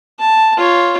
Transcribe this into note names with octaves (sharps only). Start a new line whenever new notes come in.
A5
F4 C#5